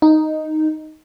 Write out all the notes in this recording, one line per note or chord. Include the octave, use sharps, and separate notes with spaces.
D#4